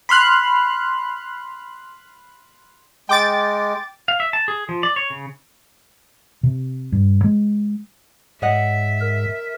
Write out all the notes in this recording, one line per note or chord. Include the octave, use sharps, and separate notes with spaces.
B5 C6 F6 F#6
G#3 G5 D6 A6
F5
E5
A5
G#4
F3
D5
C#5
C#3
C3
G2
G#3
G#2 C#5 D#5 E5 F#5
A#4